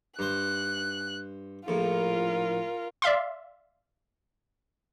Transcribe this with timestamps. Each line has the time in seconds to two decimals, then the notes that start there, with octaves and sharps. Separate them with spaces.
0.19 G2 C5 F#6
1.68 A#1 A2 F4 A#4
3.02 D5 E5 F5 C6